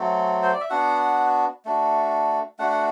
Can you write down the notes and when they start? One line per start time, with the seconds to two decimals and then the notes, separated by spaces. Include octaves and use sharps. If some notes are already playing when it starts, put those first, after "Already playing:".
Already playing: F#3 A3 C4
0.42 C5
0.53 D5
0.61 E5
0.70 B3 D4 F#4 F#5
1.65 A3 D4 F#4
2.59 A3 D4 F#4 F#5
2.71 F#5